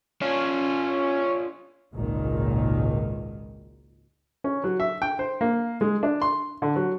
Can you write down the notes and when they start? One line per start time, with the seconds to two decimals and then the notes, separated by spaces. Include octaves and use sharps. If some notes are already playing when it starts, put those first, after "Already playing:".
0.22 C#4 D4 F4
1.93 G#1 C#2 A#2 D#3
4.44 C#4
4.64 F#3
4.80 E5
5.02 G5
5.19 C5
5.41 A#3
5.81 G#3
6.03 D4
6.22 C6
6.62 D3
6.76 F#3